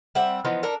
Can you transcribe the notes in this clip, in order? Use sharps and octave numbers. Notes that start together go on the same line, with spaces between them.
G3 C4 E5 F#5
E3 F3 B3 D#4
D4 A4 A#4